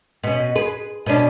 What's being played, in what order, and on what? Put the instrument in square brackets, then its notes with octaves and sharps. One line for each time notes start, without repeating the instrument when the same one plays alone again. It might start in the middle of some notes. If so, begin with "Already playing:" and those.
[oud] B2 C#4
G#4 B4
B2 C#4 D4